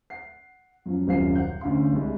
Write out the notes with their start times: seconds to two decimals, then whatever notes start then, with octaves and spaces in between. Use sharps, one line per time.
0.10 F#5 C7
0.86 F#2 F3
1.07 D#1 C2 F#2 C5 F5 C7
1.35 F#5 G6
1.61 D2 D3 C#4 F5 C6
1.92 C2 G#3